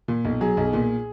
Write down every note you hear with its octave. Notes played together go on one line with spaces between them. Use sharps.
A#2
B1
F#3 G#4
B1
A#2